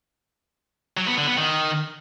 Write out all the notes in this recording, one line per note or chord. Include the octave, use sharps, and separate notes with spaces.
F#3
B3
D3
B3
D#3